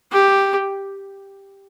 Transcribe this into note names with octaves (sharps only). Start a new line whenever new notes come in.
G4